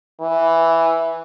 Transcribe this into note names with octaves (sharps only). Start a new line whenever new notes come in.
E3